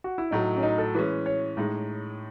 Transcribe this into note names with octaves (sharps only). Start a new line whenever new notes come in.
F#4
E4
A2 F#3 A3 D#4
C#4
D#4
A4
E3 G#3 C#4 B4
C#5
A2 G#3 D#4